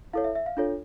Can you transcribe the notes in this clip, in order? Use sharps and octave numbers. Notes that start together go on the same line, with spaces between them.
E4 A4 C#5 F5
E5
E5
F5
D4 F4 A4 C#5